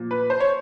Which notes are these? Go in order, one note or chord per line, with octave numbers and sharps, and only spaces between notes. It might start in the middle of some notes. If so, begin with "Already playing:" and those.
Already playing: A#2 F3
B4
C5
C#5